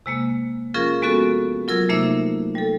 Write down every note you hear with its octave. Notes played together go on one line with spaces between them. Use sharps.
C3 G#3 A#3
F3 C#4 F4 G#4 A#4
G#3 B3 C#4 F#4 A4
F#3 F4 A#4 E6 G#6
C3 A3 A#3 D#4 E5 D6
G3 A4